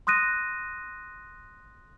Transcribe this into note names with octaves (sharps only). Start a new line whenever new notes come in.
C6 D#6 F#6 A#6 D#7